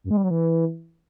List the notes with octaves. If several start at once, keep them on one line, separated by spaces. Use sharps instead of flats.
F#2
G#3
G3
F#3
E3